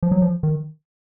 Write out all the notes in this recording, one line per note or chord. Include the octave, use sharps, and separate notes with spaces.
F3
F#3
F3
D#3